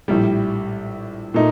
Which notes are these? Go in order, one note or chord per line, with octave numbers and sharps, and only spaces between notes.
A#1 A2 G3
A#2 A3 D#4